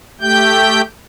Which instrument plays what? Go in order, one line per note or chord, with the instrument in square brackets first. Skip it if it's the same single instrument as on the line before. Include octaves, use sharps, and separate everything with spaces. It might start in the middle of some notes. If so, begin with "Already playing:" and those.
[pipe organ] A3 G4 G5 G6